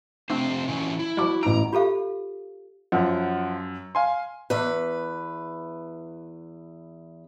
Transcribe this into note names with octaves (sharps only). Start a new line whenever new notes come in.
F2 C3 A3 C4 D4 C5
E3 F#3 C#4
E4
F3 G3 F#4 D6
A1 E4 A#5 D7
F4 G4 A4 F5
F#2 F3 F#5
F5 G#5 C6
E2 B4